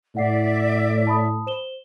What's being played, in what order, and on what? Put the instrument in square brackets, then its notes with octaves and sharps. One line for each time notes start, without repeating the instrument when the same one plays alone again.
[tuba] A2 [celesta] E4 F#5 C7 [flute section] D5 E5
[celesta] A5 B5 D#6
C5 E7 G7